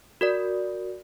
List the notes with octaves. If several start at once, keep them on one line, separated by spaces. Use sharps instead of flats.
F#4 A#4 D5